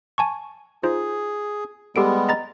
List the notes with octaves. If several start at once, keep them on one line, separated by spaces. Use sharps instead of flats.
G#5 A5 C#6
D#4 F4 G#4 C5
G3 G#3 B3 G4 A4 D7
D#5 A#5 A6